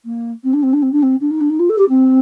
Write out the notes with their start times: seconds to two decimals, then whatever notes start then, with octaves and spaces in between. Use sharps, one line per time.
0.05 A#3
0.43 C4
0.53 D4
0.62 C4
0.73 D4
0.82 C4
0.92 D4
1.02 C4
1.20 D4
1.30 D#4
1.40 D4
1.49 D#4
1.59 F4
1.69 A4
1.78 G4
1.89 C4